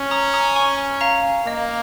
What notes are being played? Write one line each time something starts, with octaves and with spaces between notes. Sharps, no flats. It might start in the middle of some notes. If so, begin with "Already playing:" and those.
Already playing: C#4
A#5 D#6
A#5 D#6
G#5 C#6
F5 A#5
A#3 D#5